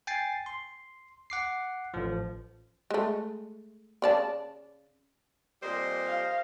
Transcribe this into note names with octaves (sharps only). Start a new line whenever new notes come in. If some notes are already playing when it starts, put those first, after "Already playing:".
G5 G#5 A6 C7
C6
F#5 D6 C7
A1 F3
G#3 A3
C#3 D5 A5
F2 A#2 G3 C5 D#5
F5